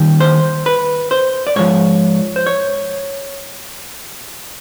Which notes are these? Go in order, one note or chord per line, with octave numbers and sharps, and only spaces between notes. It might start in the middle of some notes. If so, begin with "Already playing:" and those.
Already playing: D#2 D#3 G3
C5
B4
C5
D5
G#2 F3 C#5
C5
C#5